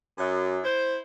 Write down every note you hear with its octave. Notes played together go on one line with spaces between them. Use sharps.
F#2
E4 C5